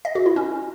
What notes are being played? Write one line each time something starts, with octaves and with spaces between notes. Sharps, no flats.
D#5
F#4
E4
C#4